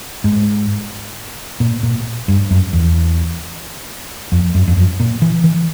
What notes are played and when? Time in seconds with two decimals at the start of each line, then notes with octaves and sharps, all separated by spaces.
0.24 G#2
1.60 A#2
1.83 A#2
2.28 G2
2.51 F#2
2.73 E2
4.32 F2
4.55 F#2
4.68 F2
4.77 F#2
5.00 A#2
5.22 E3
5.44 E3